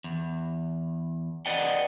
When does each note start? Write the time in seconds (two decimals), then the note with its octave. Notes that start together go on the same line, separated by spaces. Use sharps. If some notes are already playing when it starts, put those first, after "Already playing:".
0.04 E2
1.46 B4 D5 D#5 F#5 G5